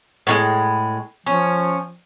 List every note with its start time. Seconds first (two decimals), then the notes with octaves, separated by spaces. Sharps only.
0.27 A2 D3 G#3
1.26 F3 C#4